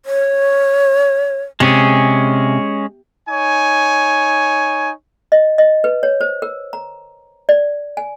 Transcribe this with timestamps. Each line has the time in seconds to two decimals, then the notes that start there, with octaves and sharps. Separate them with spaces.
0.06 C#5
1.60 C3 G#3 C#4 G#4
3.28 D#4 C#5 G#5
5.32 D#5
5.58 D#5
5.84 B4
6.03 C#5
6.21 C5
6.42 A#4
6.73 A#5
7.49 D5
7.97 G#5